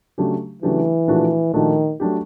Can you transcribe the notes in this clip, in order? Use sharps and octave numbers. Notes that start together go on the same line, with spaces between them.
C#3 F#3 A3 D4 G4
C#3 E3 F#3 A3 D4 G4
A#2 F3 A3 D4 F#4
A#2 D#3 F3 A3 D4 F#4
F#3 A3 D4 G4